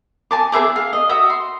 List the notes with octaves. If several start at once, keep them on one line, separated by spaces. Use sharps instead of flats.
G#5 A5 D6
G#4 C5 E5 D6
F5
D#5
F#4 E5 D#6
C6